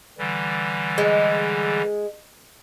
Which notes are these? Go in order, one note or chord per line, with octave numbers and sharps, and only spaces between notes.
D3 E3 G3
G#3